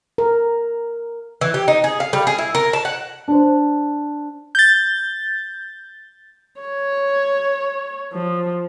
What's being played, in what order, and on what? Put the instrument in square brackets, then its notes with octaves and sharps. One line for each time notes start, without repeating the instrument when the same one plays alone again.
[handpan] A#4
[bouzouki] E3
G4
D#4
G#4
F5
G3
G#4
E4
A#4
A5
F#5
[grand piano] D4 C5
[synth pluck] G6 A6
[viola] C#5
F3